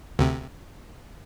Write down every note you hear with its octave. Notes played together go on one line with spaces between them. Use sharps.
D2 C3